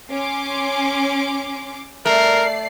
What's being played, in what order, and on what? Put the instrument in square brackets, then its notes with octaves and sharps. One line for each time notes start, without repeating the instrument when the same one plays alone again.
[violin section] C#4 C6 D6
[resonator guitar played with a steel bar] A3 [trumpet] A#4 [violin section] D5 C7